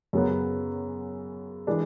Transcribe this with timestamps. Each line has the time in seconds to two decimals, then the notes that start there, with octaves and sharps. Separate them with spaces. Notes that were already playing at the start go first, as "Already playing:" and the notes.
0.13 F#2 C#3 F#3 B3
1.67 E3 G#3 D4